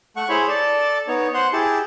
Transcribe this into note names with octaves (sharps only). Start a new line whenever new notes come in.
A3 F#5 C#6
E4 G#4 C5 C#5 B5
A4 D5 A5
B3 D#4 C#5
C5 F#5 C6
E4 G4 G#4 A5